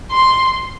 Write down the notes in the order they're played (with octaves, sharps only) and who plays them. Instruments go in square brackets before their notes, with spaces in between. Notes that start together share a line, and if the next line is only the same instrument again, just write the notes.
[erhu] C6